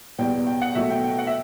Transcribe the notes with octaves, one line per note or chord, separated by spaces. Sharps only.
E2 B2 G3 B3 G5
G5
F#5
B2 F#3 A3 E5
G5
G5
F#5
E5